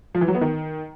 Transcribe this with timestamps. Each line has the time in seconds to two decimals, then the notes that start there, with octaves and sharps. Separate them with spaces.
0.15 F3
0.21 E3
0.28 F#3
0.35 B3
0.41 D#3